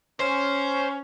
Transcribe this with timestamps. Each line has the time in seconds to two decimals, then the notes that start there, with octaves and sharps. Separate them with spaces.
0.20 C#4 C5